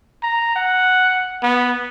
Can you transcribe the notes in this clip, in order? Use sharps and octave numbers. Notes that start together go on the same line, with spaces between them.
A#5
F#5
B3